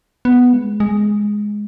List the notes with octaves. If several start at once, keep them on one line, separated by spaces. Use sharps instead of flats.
B3
G#3
G#3